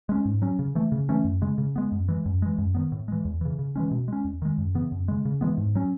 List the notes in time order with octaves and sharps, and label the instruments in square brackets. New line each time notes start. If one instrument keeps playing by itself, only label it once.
[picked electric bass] G#3 C#4
G#2
F#3 C#4
C#3
E3 A3
C#3
E3 A3 C#4
F#2
C#3 G#3
C#3
G#3 B3
F#2
E3 G#3
F#2
E3 G#3
F#2
D#3 F#3 B3
A2
E3 G#3
E2
C#3 E3
C#3
E3 G#3 C#4
B2
G#3 C#4
E2
D#3 G#3
F#2
C#3 E3 B3
F#2
C#3 G#3
C#3
E3 G#3 B3
G#2
F#3 C#4